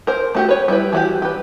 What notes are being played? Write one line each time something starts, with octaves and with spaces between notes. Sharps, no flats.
A#4 C5
A3 F#4 G4
B4 C#5
G3 E4 B4
E3 F#4 G4
G4 B4